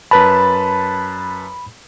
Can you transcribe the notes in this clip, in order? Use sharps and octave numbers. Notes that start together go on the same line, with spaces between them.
F#2 B4 A5 B5